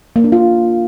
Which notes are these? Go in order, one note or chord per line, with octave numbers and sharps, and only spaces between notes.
A#3
D4
F4